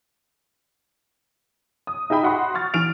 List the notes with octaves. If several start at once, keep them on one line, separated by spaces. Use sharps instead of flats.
D#6
D#4 G#4 E5 G5 B5
F#4 F#5 B5 C6
C#6 F6 A6
E3 F6 D7 F7